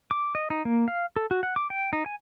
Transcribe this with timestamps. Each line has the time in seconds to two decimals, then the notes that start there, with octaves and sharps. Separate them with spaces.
0.11 D6
0.35 D#5
0.50 D#4
0.65 A#3
0.88 F5
1.16 A4
1.31 F#4
1.43 F#5
1.56 D6
1.70 G5
1.93 D#4
2.06 G#5